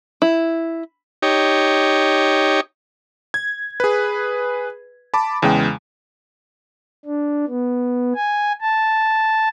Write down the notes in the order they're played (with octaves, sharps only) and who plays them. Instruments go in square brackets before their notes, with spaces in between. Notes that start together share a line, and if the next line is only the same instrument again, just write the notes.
[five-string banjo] E4
[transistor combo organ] D#4 G4 C#5
[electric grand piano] G#6
G#4 B4
A5 B5 D6
E2 C#3 G#3 G5
[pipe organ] D4
B3
G#5
A5